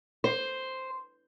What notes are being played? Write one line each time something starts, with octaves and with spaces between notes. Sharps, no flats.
C5